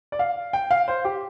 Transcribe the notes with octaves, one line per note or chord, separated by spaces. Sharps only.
D5
F5
G5
F5
C5
G4